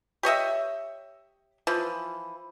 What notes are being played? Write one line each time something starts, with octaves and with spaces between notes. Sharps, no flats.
G4 C#5 D#5 E5
E3 F3